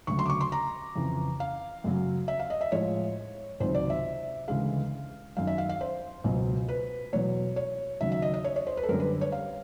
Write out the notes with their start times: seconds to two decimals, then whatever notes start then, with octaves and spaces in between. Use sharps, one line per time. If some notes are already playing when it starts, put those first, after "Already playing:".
0.07 D2 C#3 F#3 C#6
0.19 C6
0.26 D6
0.30 C#6
0.41 C6
0.52 A#5
0.95 F2 C#3 E3
1.40 F5
1.84 F#2 C#3 F#3
2.28 E5
2.40 F5
2.50 D#5
2.61 E5
2.72 A2 F3 G#3 C#5
3.60 C#2 C3 D#3 F#3 C5
3.75 D5
3.90 E5
4.48 D2 C#3 E3 G#3 F5
5.37 F#2 D#3 F#3 F5
5.47 E5
5.58 F5
5.69 F5
5.81 C5
6.24 C#2 B2 F#3
6.68 B4
7.13 E2 B2 F#3 C#5
7.56 C#5
8.01 D#2 C#3 F#3 E5
8.12 E5
8.22 D#5
8.34 D#5
8.44 C#5
8.56 C#5
8.67 C5
8.77 B4
8.83 A4
8.89 F#2 D3 G3 A#4
9.00 B4
9.21 C#5
9.32 F5